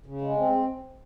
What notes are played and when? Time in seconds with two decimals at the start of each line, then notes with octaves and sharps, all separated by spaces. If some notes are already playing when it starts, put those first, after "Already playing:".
0.06 C#3
0.21 G#3
0.37 C4